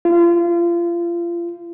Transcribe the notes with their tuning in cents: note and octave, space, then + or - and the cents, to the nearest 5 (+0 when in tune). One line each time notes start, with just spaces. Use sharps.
F4 -30